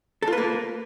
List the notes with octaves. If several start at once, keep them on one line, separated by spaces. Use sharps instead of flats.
A4
F4
B4
A#3